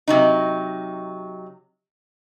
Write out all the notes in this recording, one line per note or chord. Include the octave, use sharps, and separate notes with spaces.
C3 F#3 D#4